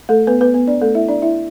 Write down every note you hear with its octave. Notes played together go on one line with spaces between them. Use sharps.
A3 A4
B3 B4
B3 B4
B3 B4
D4 D5
A3 A4
E4 E5
D4 D5
E4 E5